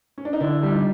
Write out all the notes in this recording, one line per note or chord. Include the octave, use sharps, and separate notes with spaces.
C#4
D4
D#4
D3 D4 E4
G3
D#4 F4